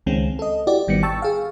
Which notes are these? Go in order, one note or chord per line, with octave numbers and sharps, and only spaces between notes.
C#2 D#3 G#3 C4 C#4
A4 D#5
E4 F#4 G4 D5
G#1 D#3 G3 B3 C#7
G5 A5 C#6 E6 A6
G#4 F5